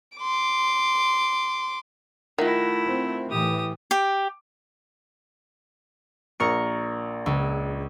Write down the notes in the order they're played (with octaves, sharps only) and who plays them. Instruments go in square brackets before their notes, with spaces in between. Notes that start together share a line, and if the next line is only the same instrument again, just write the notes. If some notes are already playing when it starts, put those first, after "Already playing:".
[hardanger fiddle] C6 D6
[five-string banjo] D#3 [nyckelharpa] A3 E4 [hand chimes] F4 E5 F#5
[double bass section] C4
[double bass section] A2 E3 [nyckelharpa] G4 D#6
[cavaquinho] G4
[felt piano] A#1 [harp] A#4 C#6 C#7
[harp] C#2